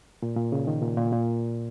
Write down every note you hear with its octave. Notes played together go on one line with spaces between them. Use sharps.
A#2
A#2
C#3
D#3
A#2
A#2
A#2